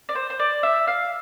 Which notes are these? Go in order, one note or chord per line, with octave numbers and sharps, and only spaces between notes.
D5
C5
C5
D5
E5
F5